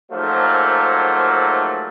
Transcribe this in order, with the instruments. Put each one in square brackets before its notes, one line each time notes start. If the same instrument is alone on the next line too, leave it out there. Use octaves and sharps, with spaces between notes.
[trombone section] G#2 F3 F#3 A3 A#3